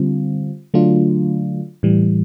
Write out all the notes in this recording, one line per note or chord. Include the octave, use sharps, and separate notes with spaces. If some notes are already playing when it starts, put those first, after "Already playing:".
Already playing: D3 G3 C4 F4
D3 F#3 A3 D4 F4
A2 E3 G3